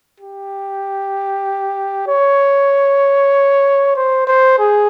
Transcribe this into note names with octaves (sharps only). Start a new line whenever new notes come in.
G4
C#5
C5
C5
G#4